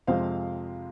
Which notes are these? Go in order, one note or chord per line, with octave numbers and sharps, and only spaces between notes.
F2 C3 F3 G#3 C5 F5